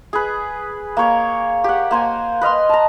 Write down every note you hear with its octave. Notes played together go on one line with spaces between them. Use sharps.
G#4 B4
A#3 C#5
G4 F#5
A#3 C5 G#5
B4 D#5 F5 C6
A5 A#5